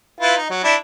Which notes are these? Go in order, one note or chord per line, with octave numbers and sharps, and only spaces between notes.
E4 F4 B4
D#4
F#3
D4 E4